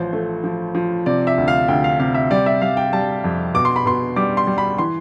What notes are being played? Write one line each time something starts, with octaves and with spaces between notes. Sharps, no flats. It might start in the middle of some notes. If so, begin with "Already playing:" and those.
Already playing: A1 F3 C5
A3
F3
F3
C3 D5
E5
D2
F5
D2 G5
F5
C3 F5
E5
G3 D5
E5
G3 F5
G5
G3 A5
F2
B2 D6
C6
B5
B2 C6
G3 D6
C6
G3
B5
E3 C6